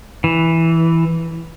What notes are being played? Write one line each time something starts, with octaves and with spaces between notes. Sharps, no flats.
E3